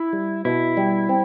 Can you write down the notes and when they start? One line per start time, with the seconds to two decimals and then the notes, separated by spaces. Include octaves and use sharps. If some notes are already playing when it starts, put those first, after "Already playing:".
Already playing: E4
0.13 G3
0.45 B2 E4
0.77 G3
1.09 C4